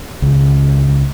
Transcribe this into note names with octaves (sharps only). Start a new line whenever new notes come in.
C#2